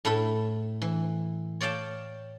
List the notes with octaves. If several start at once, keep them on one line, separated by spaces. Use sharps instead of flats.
A2 A3 E4 A4
E3
C#5 D5 F5 G5 A5